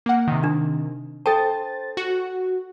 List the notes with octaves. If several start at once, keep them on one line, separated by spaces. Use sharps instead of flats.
A#3 F#5
C3 D#3
D4
A4 C5 G5 A5 A6
F#4